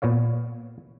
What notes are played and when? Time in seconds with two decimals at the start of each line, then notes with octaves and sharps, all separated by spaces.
0.02 A#2 B3 C#5 F5